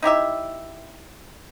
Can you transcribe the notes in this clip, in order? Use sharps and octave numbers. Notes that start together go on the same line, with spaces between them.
D#4 E4 G4 E5